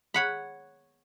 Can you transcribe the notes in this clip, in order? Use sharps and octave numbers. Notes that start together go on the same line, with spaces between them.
C#5 F#5 B5